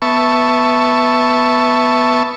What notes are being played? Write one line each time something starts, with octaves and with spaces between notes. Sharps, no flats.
B3 E5 A5 C#6